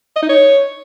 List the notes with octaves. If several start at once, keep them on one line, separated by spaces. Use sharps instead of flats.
D#5
D#4
C#5